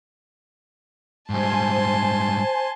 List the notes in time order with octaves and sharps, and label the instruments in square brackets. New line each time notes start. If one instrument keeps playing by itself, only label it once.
[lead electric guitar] G#2 G3 [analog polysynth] C5 G#5 [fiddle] A5 C6